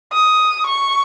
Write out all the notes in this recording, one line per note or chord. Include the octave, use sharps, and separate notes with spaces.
D#6
C#6